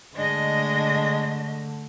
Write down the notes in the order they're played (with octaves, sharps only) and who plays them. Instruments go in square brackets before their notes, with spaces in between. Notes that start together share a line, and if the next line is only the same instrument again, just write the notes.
[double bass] D3 A3 [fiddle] G#3 [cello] D4 D#5